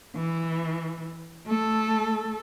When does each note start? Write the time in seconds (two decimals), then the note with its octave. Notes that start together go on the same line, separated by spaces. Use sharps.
0.16 E3
1.46 A3 A4